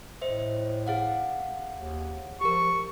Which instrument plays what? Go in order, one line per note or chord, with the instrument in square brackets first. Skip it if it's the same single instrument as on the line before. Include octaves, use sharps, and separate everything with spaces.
[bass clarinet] A2 [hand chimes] C5 D#5 E5
[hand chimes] G#4 F5 F#5
[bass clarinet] D#2
[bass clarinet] F3 [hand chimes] G4 A#4 [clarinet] C#6